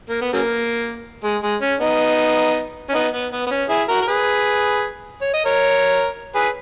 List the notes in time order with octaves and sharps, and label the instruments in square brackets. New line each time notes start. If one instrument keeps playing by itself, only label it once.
[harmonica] A#3
B3
C#3 F#3 A#3
G#3
G#3
C#4
B3 D#4
C#4
B3 D#4
B3
B3
B3
C#4
E4 G#4
F#4 A#4
A#4
G#4 B4
C#5
D#5
A#4 C#5
G#4 B4